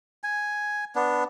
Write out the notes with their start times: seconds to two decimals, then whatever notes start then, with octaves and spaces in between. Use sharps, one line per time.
0.24 G#5
0.96 B3 D4